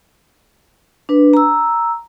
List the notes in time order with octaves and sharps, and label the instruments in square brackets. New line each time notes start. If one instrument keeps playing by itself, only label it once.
[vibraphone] D4 B4
A#5 E6